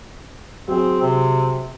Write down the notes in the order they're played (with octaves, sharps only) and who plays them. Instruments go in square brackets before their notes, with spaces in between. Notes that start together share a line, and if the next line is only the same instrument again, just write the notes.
[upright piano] F#3 G#4 [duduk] C4
[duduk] C3